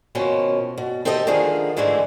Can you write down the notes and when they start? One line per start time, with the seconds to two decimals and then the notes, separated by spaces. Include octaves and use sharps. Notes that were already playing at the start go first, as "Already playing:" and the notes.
0.15 B2 D#3 F3 C4 C#4
0.78 B2
1.05 C4 G4 A4 D#5 E5
1.27 D3 D#3 F3 G#4 F5
1.77 G#2 D3 E3 G#3 A3